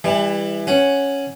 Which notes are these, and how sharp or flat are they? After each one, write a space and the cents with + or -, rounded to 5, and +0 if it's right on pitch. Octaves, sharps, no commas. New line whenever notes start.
E3 +0 G3 +30
C#4 +0 F#5 +0